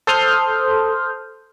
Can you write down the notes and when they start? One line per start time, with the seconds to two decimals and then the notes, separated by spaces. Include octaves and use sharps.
0.07 A4 C5 C6 D#6 F6 G6